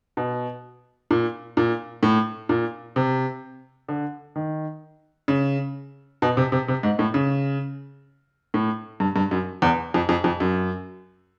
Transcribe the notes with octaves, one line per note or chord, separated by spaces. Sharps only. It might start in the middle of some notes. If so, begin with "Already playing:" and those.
B2
A#2
A#2
A2
A#2
C3
D3
D#3
C#3
B2
C3
C3
C3
G#2
A2
C#3
A2
G2
G2
F#2
E2
F2
F2
F2
F#2